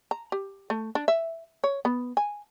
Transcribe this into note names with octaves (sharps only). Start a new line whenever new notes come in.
A#5
G4
A3
D4
E5
C#5
B3
G#5